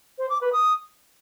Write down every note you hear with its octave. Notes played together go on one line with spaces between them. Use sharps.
C5
D6
B4
D#6